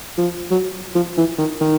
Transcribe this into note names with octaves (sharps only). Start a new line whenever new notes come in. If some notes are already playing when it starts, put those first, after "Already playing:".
F3
F#3
F3
E3
D#3
D#3